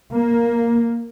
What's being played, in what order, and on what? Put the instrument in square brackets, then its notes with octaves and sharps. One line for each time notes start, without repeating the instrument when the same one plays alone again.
[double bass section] A#3